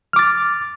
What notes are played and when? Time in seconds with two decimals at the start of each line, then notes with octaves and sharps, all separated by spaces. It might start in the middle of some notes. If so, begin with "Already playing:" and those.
0.13 F6
0.16 D6
0.19 A6